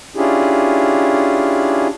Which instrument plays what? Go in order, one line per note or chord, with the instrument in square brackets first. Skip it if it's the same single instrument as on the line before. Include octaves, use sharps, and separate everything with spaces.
[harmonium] C#4 D4 E4 F4 G4 G#4